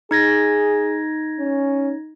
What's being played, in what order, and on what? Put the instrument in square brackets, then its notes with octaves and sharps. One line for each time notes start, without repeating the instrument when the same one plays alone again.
[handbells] D#4 G#6 A#6 [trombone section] G#4
[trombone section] C#4